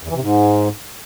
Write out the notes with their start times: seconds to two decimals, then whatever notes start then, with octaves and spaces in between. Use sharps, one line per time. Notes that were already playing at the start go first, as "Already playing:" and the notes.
0.03 E2
0.09 E3
0.15 C3
0.21 G#2